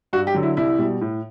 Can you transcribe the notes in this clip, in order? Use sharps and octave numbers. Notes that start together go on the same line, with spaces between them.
G2 F#4
G4
D3 F#3
E4
C2 E4
B2 G3
A2